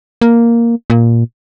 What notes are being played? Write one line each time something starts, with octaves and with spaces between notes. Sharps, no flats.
A#3
A#2